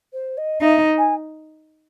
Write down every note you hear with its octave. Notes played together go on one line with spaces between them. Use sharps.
C5
D#5
D#4 E5
G#5